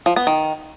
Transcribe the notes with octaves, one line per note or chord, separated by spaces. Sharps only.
F3
B3
D#3